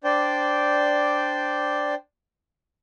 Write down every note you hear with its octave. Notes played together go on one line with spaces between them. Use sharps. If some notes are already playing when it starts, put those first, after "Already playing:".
D4 C5 D5 G5